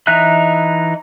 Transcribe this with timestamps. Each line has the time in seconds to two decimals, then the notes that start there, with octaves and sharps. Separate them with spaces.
0.07 E3 D#4 D#5 E5 F#6